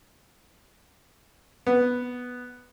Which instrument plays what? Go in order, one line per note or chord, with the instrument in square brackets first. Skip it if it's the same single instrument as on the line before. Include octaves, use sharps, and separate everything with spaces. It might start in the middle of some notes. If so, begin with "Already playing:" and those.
[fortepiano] B3